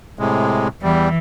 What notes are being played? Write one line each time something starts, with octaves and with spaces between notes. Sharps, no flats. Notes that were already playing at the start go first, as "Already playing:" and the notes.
A2 C3 G#3
E2 E3 G3